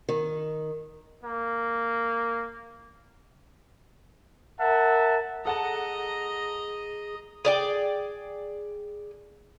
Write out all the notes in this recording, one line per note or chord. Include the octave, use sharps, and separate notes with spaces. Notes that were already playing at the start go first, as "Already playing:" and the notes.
D#3
A#3
A#4 E5 F#5 A5
G#4 A4 D#5 F#5 A5 A#5
G#4 D5 G5